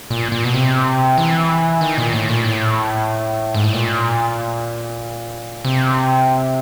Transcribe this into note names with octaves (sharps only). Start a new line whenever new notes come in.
A#2
A#2
B2
C3
E3
D#3
A#2
A2
A#2
A2
G#2
A2
A#2
C3